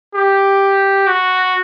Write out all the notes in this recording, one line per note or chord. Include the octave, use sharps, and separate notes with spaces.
G4
F#4